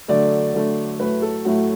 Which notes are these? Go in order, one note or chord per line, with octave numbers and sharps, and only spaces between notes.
D3 F#3 A3 D5
D3 F#3 A3
A2 F#3 A3 B4
A4
A2 F#3 A3 F#4